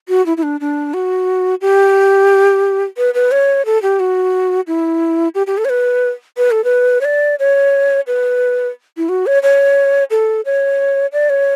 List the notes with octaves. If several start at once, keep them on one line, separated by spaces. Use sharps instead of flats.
F#4
E4
E4
D4
D4
F#4
G4
B4
B4
C#5
A4
G4
F#4
E4
G4
G4
A4
C#5
B4
B4
A4
B4
C#5
D5
C#5
B4
E4
F#4
C#5
C#5
A4
C#5
D5
C#5